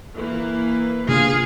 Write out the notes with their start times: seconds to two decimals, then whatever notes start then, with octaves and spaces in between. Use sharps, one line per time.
0.15 E3 A#3 B4
1.08 C3 A#3 D4 F4 G#4 F5